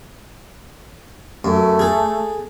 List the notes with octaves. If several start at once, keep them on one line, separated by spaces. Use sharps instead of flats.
F#2 A3
G#4 A4